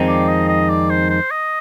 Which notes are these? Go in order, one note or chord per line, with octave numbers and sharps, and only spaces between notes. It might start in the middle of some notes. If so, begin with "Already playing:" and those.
Already playing: F2 D#3 G#3 C4 D#4
D5
D#5
D#5
D5
C5
C5
D#5